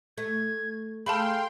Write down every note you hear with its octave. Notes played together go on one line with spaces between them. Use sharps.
A3 G#6
A3 G#4 A4 F5 G5 A5 B5 C6